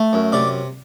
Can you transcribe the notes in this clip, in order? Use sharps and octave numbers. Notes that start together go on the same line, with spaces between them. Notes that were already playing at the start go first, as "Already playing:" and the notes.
Already playing: A3
F#2
C3 D5